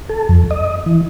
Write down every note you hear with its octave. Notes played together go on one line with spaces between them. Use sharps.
A4
F2
D#5
E3